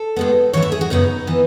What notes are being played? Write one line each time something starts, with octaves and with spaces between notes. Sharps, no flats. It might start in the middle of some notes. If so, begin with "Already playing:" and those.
Already playing: A4
A2 G#3 B3
G#2 E3 A3 C#5
E5
G#4
F#4
F#2 C#3 F#3 B3 D#4
E3 B3